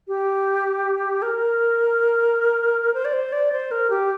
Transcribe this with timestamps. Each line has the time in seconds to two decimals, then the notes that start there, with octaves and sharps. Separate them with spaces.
0.08 G4
1.22 A#4
2.94 C5
3.05 D5
3.13 C5
3.32 D5
3.52 C5
3.71 A#4
3.90 G4